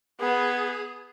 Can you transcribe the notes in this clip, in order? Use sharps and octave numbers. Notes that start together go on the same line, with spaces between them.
B3 G#4